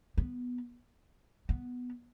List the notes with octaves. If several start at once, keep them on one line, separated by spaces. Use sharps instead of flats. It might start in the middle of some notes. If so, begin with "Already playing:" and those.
B3
B3